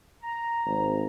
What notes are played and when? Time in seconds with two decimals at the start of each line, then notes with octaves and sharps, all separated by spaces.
0.23 A#5
0.65 G#1